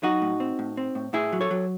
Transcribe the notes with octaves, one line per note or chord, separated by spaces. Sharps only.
F#3 D#4 F#4
A2
C4
A2
C4
A2
A2 E4 G#4
F#3
A4 C#5
F#3